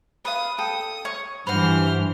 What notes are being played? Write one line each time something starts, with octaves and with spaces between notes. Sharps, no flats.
B4 F5 D#6
A4 G5 D#6
C#5 C#6
G2 E3 F#4 B4 C5 F6